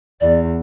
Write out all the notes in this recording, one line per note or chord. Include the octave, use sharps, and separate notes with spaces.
E2 D5